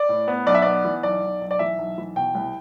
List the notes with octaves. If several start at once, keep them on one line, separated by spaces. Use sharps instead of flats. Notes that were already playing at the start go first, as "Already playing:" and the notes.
Already playing: D5
A2
B3
B1 D5
E5
B3 D5
E3
B1 D5
B1
B1
D5
E3 E5
B1
E3
B2 G5
C2